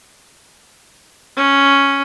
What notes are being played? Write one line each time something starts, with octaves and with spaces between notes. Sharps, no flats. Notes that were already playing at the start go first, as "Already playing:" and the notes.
C#4